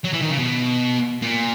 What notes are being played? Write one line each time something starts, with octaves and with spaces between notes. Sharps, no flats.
F#3
E3
D#3
C#3
B2
A#2